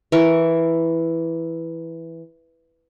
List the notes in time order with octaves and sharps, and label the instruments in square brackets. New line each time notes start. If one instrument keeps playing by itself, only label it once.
[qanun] E3 A#4 C#6